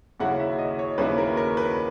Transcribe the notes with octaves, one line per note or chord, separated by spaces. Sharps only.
D#2 C#3 F#3 C#4 E4 F#5
E5
D#5
C#5
D#2 C#3 F#3 C#4 E4 B4
A#4
A#4
B4